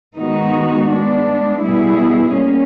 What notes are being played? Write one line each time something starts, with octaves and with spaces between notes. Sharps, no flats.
D#3 G#3 B3 D#4 F#4
G#3 B3 D4
B2 G3 B3 E4 G#4
A#3 C#4